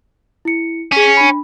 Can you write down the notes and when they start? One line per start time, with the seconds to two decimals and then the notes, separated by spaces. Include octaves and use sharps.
0.45 E4 C#7
0.92 C#4 G#4 B6
1.17 D4 B5